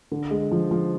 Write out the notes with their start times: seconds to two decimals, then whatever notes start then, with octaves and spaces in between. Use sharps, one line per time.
0.11 D3
0.31 G#3
0.51 F3
0.71 F3